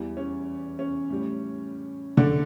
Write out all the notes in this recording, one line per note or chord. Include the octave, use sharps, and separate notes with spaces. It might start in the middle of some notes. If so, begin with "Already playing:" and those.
Already playing: E2 E3 G3
C#4
C#4
A2 G3
D3 D4